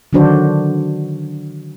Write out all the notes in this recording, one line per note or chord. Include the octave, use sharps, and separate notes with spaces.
D3 D#3 F#3 D4 F#4 C5